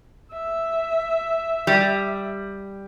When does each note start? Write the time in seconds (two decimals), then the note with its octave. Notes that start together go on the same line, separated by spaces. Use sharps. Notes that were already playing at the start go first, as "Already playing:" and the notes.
0.33 E5
1.67 G3